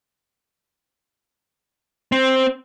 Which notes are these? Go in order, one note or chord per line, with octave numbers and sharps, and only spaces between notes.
C4